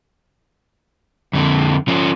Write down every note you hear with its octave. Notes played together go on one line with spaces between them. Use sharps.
F2 D3
F3 C#4